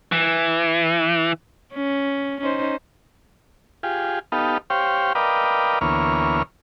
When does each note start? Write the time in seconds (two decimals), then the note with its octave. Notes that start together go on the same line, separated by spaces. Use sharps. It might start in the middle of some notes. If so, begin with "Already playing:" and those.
0.12 E3
1.74 C#4
2.41 C#4 D#4 C5
3.83 F4 G4 G#4
4.32 B3 D#4 G4 A4 F5
4.70 G4 C5 C#5 F5 G5
5.15 A#4 B4 D5 D#5 F5 G5
5.81 D2 E3 A#3 B3 C#5 F6